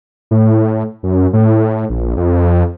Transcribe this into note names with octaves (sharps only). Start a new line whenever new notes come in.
A2
F#2
A2
A#1
F2